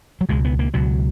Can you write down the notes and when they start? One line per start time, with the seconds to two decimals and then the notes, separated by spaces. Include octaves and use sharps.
0.21 F#3
0.29 C#2 B2 G#3
0.45 B3
0.59 A#3
0.74 C#2 B2 F#3